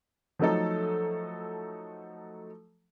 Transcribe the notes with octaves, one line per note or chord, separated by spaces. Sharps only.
F3 F#3 A3 D#4 A4